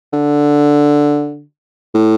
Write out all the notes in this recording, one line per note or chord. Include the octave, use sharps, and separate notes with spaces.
D3
A2